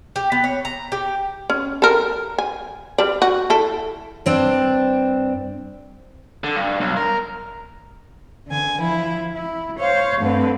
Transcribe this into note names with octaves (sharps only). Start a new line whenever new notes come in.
G4
B3
C#5
A#5
G4
C#4
A4 A#4
G#5
G3 D5
F#4
E4 A4
G2 C4 D4
D3
G2
B1
A#4
D3 G#5
F3 E4
E4
C5 C#5 F5
G2 D3 A3 C4 B4